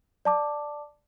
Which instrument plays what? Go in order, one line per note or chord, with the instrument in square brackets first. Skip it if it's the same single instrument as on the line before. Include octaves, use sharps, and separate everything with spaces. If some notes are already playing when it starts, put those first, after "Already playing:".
[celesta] D5 A5 D6